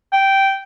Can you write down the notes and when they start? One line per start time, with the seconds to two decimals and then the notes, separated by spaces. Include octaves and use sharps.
0.13 G5